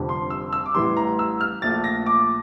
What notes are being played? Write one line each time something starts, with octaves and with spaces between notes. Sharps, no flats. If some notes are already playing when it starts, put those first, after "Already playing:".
Already playing: F1 F2 D3 G3
C6
E6
E6
D6
A1 A2 E3 G3 C6
A#5
E6
F6
A#1 A#2 A3 A6
A#6
D6